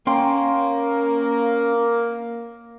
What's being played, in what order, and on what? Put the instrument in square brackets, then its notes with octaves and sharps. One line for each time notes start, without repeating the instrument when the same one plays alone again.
[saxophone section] A#3 [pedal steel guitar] C#4 G5 C6